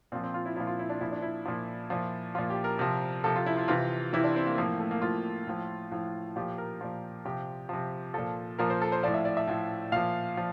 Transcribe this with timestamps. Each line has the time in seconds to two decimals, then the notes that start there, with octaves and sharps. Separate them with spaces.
0.12 A#2 C4
0.15 F3
0.23 C4
0.34 F4
0.46 E4
0.56 A#2 F3 E4
0.67 F4
0.79 E4
0.89 D4
1.01 A#2 F3 E4
1.12 D4
1.22 E4
1.45 A#2 F3
1.90 A#2 F3
2.35 A#2 F3 F4
2.50 G4
2.64 A#4
2.79 C3 F3
3.24 C3 F3 A4
3.36 F4
3.46 E4
3.57 F4
3.68 C3 E3 F4
4.13 C3 E3 E4
4.24 D4
4.36 C4
4.47 A#3
4.58 A2 F3 A#3
4.79 A3
4.91 A#3
5.02 A2 F3 F4
5.47 A2 F3
5.91 A2 F3
6.36 A#2 F3 G4
6.58 A#4
6.81 A#2 F3
7.25 C3 F3 G4
7.69 C3 F3
8.14 A#2 F3 A4
8.59 A#2 F3 A#4
8.70 C5
8.82 A4
8.92 C5
9.03 F3 D5
9.07 A2
9.14 E5
9.25 D5
9.37 E5
9.47 A2 F3
9.92 A#2 F3 F5
10.37 F3